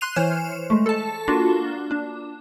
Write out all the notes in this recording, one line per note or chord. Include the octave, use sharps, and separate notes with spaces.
C6 F#6 C7 D#7 F7
E3 C5 C#5 F6 E7
G#3 A3
A4 A5
A#3 D4 F4 F#4
D4